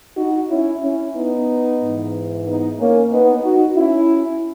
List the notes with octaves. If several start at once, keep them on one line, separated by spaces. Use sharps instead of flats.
D#4 F#4
C#4 E4
C#4 E4
B3 D#4
G#2 E3
B3 D#4
A#3 C#4
B3 D#4
D#4 F#4
C#4 E4